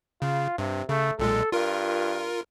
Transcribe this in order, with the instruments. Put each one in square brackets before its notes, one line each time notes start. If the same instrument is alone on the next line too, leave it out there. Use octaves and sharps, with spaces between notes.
[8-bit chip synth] C#3 [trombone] F4
[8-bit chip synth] G2 [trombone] C3
[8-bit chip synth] C#3 [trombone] A3
[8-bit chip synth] B1 A#2 G#3 [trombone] A4
[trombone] G2 [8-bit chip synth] F4 A#4